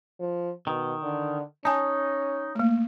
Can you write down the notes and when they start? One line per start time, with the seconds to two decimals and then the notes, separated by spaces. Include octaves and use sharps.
0.20 F3
0.67 B2 D#3
1.02 D3
1.65 C#4 D#4 G#5 A5
2.55 A3 A#3